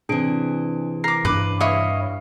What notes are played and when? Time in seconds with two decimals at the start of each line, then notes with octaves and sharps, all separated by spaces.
0.09 C3 E3 D4 G#4 D7
1.04 A#4 D6 C7
1.25 G2 C#4 D4 B4 D6
1.61 E4 C#5 D#5 F5